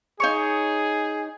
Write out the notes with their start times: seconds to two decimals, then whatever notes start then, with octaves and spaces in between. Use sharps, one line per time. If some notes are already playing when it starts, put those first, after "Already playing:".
0.20 D#4 G#4 C#5 C#6